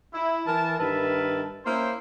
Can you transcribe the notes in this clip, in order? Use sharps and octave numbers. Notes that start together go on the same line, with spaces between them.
E4
E3 A#4 A5
G2 D#3 A#4 B4 E5 A5
A#3 C#4 E4 C5